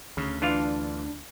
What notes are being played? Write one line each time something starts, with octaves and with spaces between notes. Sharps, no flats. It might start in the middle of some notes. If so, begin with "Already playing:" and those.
D2 C#3
E3 D4 F4 F5